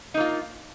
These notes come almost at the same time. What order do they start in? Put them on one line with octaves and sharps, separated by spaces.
D#4 A#3 F4